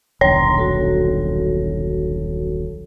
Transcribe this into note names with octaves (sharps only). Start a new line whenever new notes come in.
D#1 B1 D3 C#5 A#5 C6
F#4 A4